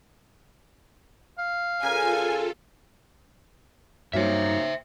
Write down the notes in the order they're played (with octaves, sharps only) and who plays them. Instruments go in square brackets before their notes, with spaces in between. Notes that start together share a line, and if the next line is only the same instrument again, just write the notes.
[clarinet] F5
[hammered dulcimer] C#3 G4 A#4 [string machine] F4 A4 [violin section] G#5
[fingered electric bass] G2 G3 [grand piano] F#3 A#3 C#4 [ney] D#4 [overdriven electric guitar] C5 E5